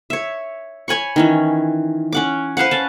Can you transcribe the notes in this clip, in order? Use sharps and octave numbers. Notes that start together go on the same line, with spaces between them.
C#5 E5
C#5 G#5 B5 C#6
D#3 E3 C#4
C#4 F#5 D6
B4 C5 F5 F#5
C#4 A5